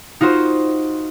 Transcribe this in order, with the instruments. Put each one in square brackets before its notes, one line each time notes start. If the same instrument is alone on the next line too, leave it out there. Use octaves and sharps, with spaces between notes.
[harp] D#4 F4 F#4 C5